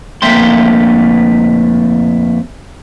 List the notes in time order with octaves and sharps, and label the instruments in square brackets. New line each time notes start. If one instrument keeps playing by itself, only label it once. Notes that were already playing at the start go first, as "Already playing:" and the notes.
[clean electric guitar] F2 A3 A#3 E5 G5 C6